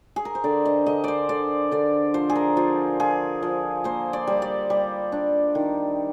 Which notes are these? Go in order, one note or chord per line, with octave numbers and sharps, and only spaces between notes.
G#4
A#4
C5
D3 D5
D#5
D3 D#5
C5 D5
D3 D5
D3 D5
F3 C5
G#4
A#4
F3 F4
F3 G#4
F3
A#3 C5
D5
G3
D5
G3
D4
D#3